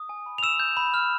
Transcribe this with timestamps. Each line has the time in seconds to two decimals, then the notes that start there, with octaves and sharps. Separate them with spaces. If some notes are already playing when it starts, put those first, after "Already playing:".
Already playing: D#6
0.09 G#5
0.26 B5
0.38 F7
0.43 E6 E7
0.60 G6
0.77 B5
0.94 F6